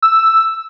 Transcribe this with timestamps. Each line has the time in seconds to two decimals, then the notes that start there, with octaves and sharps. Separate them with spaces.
0.02 E6